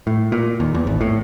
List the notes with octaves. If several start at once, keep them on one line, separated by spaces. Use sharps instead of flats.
A2
A#2
D#2
E2
G#1
A2